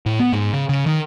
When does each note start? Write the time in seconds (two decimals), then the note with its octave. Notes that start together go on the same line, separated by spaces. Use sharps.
0.06 A2
0.20 B3
0.33 G#2
0.53 C#3
0.69 C#3
0.86 D#3